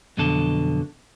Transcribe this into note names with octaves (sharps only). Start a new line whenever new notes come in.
B1 F2 B2 D3 A4